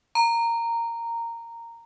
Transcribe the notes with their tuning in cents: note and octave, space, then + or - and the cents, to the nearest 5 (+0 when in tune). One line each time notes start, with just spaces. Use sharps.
A#5 -10